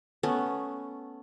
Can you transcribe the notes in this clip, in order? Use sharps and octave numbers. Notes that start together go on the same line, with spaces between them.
A3 B3 C#4